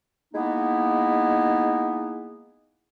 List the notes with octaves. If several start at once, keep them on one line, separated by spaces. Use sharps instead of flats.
G#3 A#3 B3 D#4 E4